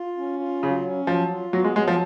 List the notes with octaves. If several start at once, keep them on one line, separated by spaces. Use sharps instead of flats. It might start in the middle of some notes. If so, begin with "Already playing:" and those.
Already playing: F4
C#4
F4
C#3 F#3
C#4
F3 F#3
F4
F#3 B3
G#3
F#3 G#3
F3